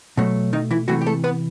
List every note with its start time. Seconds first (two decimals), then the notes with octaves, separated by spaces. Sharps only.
0.17 B2 F#3 A3
0.53 D#3 D#4
0.71 E3 E4
0.88 C3 E3 F#3 A3 F#4
1.01 G4
1.06 A3 A4
1.24 B3 B4